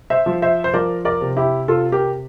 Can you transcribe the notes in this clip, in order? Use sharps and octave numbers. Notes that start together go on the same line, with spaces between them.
C5 E5
F3
C5 E5
C5
F3 A#4 D5
A#4 D5
C3
E4 G4
C3 F4 A4
G4 A#4